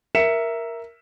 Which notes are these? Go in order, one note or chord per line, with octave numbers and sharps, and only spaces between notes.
A#4 E5 B6 C#7 E7